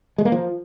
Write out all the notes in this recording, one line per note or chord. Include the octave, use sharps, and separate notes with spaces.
G#3
A#3
F3